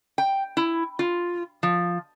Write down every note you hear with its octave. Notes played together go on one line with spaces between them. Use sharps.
G5
E4
F4
F3